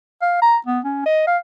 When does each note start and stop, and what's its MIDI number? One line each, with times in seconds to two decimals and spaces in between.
0.22 0.38 77
0.42 0.57 82
0.66 0.80 59
0.85 1.03 61
1.06 1.24 75
1.27 1.38 77